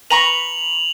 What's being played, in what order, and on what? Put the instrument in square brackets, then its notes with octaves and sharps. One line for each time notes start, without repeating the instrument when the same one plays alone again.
[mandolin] B4 A#5 C#6 [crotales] F7 F#7